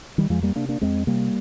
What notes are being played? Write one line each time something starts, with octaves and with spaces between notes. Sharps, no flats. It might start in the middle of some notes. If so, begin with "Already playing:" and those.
D#3 G3
F2 F3 G#3
G3 A#3
C3 A#3 D4
A#3 D4
F2 G#3 C4
C3 G3 A#3